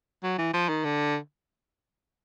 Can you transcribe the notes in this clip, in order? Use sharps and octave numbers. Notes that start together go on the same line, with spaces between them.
F#3
E3
F3
D#3
D3